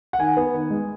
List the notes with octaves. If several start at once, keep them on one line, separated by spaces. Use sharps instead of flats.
F#5
D#3 G#5
B3
D#3
G#3